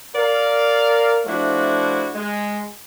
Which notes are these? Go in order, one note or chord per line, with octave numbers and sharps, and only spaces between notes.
A#4 D5 F5
F3 A3 D4 E4 F#4
G#3